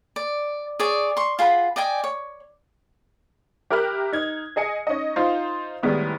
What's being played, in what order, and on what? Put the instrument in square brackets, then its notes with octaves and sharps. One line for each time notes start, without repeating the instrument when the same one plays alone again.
[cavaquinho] D5
G#4 C#5 D5
C6 C#6
F4 G#4 F#5 B5
D5 D#5 G5 G#5
C#5
[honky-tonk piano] G4 A#4 E5 B5 F6 F#6
D#4 G#6
G#4 D#5 G#5 C#7
C#4 D#4 D#5
D#4 F4 C5
A2 D#3 G3 G#3 B3 E4